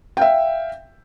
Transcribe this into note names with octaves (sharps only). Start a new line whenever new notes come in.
E5 F5 G5